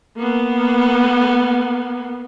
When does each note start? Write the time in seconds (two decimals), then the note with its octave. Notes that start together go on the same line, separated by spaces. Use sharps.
0.17 A#3 B3